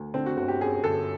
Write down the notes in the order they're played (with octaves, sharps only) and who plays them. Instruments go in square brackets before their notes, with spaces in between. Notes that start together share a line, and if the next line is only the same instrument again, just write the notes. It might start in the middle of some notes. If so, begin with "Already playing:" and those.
Already playing: [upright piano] D2
D3 C4
F#4
G1 F#4
G4
F#2 G#4
G1 A4